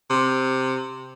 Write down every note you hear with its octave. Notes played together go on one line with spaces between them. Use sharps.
C3